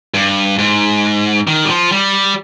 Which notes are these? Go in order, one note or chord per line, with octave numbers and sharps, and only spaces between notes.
G2
G#2
D#3
G3
F3
G3